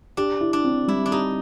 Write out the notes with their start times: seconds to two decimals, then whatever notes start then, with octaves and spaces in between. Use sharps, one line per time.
0.17 D4 G4
0.41 E4
0.53 D4
0.65 C4
0.88 G3 E4
1.06 D4
1.12 D#4 G4